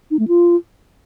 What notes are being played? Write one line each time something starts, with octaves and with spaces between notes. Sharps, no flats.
D#4
A3
F4